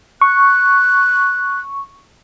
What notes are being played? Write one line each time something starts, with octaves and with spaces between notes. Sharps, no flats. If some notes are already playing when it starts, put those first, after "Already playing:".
C#6 F#6